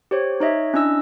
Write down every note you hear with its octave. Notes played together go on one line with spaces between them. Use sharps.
G4 C5 C#5
D#4 C#5 D#5 E5
C#4 D4 E4 D#5 E6